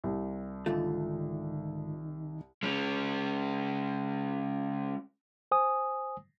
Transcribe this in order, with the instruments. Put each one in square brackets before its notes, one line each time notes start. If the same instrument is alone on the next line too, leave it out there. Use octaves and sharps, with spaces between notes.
[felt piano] C2
[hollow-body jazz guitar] G#2 D3 A3 [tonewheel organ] D#3 [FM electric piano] F4
[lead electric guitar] G#3 C#4
[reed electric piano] C5 G#5 D#6